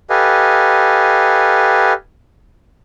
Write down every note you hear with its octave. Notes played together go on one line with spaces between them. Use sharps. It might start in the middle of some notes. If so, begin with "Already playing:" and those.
G4 A4 B4 D#5 F5 G#5